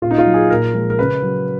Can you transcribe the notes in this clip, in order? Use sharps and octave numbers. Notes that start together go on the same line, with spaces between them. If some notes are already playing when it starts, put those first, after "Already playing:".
A#2 F4
D#4
F4
F#3
G#4
A#2 A#4
F3 G#3
A#4
C#3 B4
F#3